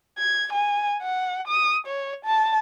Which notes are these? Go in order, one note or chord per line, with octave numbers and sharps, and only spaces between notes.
G#6
G#5
F#5
D#6
C#5
A5